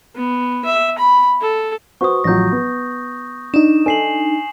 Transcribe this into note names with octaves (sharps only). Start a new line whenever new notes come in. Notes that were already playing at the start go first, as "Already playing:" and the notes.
B3
E5
B5
A4
F#4 B4 C5 C#6 D#6
A1 F3 F#3 G6 A#6
B3
D4 D#4 E7
A4 G#5 C7 F#7